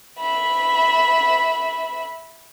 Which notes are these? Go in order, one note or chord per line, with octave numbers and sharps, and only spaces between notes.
E5 B5